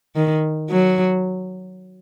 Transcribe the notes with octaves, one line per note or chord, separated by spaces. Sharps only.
D#3
F#3